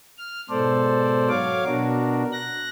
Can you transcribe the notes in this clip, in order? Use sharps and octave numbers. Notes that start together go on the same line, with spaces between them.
F6
G#2 B2 A4 C5 D5
F#3 C#5 F5 D6
B2 D4 F#4 A#4
F#6 A#6